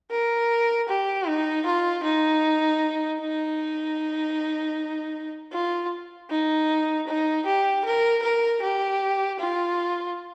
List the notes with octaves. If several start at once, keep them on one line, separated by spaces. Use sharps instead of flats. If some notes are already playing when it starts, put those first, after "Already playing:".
A#4
G4
D#4
F4
D#4
D#4
F4
D#4
D#4
G4
A#4
A#4
G4
F4